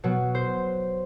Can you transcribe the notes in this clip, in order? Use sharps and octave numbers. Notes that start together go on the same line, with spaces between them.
B2 F#3
C5